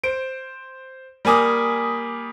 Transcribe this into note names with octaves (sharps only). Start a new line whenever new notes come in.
C5 D7
G3 A#3 G#5 D6 D#6